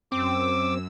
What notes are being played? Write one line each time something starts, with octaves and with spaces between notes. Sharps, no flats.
F#2 C4 D6 E6